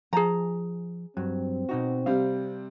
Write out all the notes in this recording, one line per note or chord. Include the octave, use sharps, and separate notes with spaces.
F3 G#4 A5 A#5
G2 F#3 C4
B2 D#4 F#4
C3 G3 F5